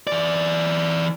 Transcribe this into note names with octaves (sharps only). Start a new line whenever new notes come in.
E3 D5